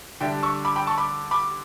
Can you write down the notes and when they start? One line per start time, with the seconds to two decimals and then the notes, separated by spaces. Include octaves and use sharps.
0.21 D3 G3 D4 E5 G5
0.43 C#6 E6
0.65 B5 D6
0.76 G5 B5
0.87 A5 C#6
0.98 B5 D6
1.31 B5 D6